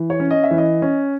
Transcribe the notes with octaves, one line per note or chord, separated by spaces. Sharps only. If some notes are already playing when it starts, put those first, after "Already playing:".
Already playing: E3
C#5
C#4
D#5
E5
E3
D#5
C#4